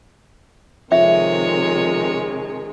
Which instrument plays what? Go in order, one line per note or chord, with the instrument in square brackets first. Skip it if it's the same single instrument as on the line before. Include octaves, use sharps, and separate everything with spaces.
[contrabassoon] F2 [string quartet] C3 D#3 G#3 [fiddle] C#5 [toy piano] E5